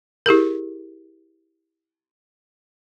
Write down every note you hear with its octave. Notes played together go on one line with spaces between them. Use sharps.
E4 G4 G#4 A#4